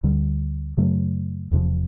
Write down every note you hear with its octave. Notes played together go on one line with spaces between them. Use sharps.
D2 D3 G3
F#2 C#3 F#3 A3
E1 E2 C3 F3